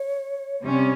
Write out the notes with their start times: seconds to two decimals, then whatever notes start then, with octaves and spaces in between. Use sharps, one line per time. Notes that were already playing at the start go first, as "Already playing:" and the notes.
Already playing: C#5
0.63 C3 G3 C#4